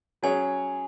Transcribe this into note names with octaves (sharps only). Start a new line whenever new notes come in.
F#3 C#4 G#4 C#5 G#5